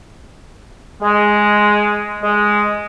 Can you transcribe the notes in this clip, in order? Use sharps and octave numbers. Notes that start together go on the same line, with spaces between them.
G#3
G#3